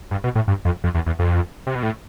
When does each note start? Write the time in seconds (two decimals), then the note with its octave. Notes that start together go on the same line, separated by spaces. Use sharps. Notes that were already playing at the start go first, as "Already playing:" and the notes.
0.11 G2
0.24 B2
0.35 A2
0.48 G2
0.65 F2
0.84 F2
0.95 E2
1.06 E2
1.19 F2
1.67 C3
1.75 B2
1.83 A2